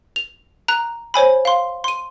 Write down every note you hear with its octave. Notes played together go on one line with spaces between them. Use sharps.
F7
A#5 F#6
C5 C#5 G#5 B5
F5 C6
C6 D#7